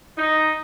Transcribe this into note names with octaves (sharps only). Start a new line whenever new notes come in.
D#4